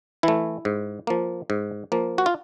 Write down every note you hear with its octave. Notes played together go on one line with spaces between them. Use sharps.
E3 A3 E4
G#2
F3 A#3
G#2
F3 A#3
F#4
F4